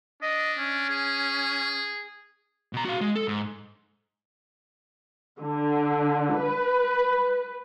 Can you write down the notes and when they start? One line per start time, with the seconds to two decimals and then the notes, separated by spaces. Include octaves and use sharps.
0.22 D4 D#5
0.58 C#4
0.89 G#4
2.73 B2 A#5
2.85 F#4 F5
3.01 G#3
3.15 A4
3.28 G#2
5.42 D3
6.38 B4